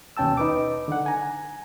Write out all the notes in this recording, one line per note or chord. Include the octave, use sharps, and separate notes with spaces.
D#2 B2 C#4 G5 A5 E6
D#4 B4 D6
D3 F#5
G#5 A#5